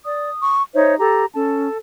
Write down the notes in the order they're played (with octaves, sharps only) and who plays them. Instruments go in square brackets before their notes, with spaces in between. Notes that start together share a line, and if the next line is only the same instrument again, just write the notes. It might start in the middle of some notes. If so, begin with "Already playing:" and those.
[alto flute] D5 [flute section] D#6
[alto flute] C#6
[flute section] D#4 C#5 E5 [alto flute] C5
[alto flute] G4 [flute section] A4 A#5
[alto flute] C#4 [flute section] A4 A5